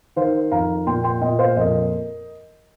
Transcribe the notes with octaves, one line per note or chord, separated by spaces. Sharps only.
D#3 C5 F5
F2 F5 A#5
A#2 G5 C6
G5 C6
A#2 D#5 G5
C5 F5
F2 A#4 D#5